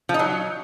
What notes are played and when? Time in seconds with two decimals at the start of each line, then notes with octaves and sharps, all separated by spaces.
0.09 F3
0.14 D#4
0.19 F#3